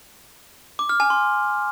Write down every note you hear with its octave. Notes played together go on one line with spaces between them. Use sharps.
D6
F6
G#5
C6